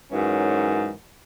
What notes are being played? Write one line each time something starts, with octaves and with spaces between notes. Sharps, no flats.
G#2 E3 F#3 C#4 A#4